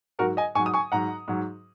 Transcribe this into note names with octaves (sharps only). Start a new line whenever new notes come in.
G#2 F#3 F#4 A#4
D#5 G#5
G#2 F#3 G#5 C#6
D#6
G#5 C#6
G#2 F#3 F#5 A#5
G#2 F#3